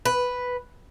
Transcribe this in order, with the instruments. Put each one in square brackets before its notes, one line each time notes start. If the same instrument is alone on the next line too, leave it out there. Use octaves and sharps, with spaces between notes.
[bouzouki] B4